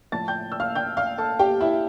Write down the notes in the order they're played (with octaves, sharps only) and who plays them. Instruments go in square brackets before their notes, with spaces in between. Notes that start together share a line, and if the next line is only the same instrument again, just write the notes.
[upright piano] A2 F3 A5 A6
G5 G6
E6
F5 F6
G5 G6
F5 F6
A4 A5
G4 G5
E4 E5